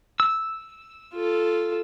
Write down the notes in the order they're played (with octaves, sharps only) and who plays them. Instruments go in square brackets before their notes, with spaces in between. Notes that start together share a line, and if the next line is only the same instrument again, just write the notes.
[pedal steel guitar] E6
[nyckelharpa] F4 A4